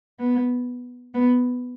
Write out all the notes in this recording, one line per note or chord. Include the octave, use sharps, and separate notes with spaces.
B3
B3